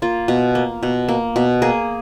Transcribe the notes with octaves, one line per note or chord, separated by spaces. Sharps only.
A#3 F4
B2
A#3
B2
A#3
B2
A#3 G#4